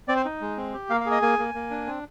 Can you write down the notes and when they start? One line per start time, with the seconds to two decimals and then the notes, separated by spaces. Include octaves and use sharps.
0.08 C4 D5
0.16 C5
0.25 D#4
0.41 G#3
0.57 C4
0.74 G4
0.90 A#3 F5
1.01 F5
1.06 G#4
1.11 D#5
1.22 A#3 G#5
1.39 A#3
1.55 A#3
1.71 D4
1.87 C4